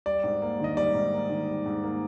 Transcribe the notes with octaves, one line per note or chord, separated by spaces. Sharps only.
G3 D5
G#2
A#3
D#3 D#5
G3 D5
G#2
A#3
D#3
G3
G#2
A#3